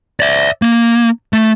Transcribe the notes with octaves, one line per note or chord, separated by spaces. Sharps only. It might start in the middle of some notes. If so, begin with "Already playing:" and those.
D5 E5
A#3
A3